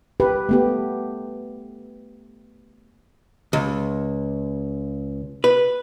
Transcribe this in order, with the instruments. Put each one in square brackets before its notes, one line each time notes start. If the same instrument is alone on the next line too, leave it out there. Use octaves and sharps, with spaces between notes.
[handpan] G4 B4
A3 B3 G4
[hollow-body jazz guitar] C#2
B4